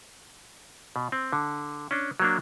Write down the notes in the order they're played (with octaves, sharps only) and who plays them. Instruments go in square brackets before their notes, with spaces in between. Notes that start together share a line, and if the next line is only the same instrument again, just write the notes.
[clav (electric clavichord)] B2
C4
D3
C#4 D4
F#3 A#3 D4